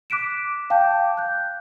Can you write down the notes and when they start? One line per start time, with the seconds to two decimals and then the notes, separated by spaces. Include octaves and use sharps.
0.10 D6 F#6 B6 D7 E7
0.70 F5 G5 A5 D6 G6
1.17 F#6 G6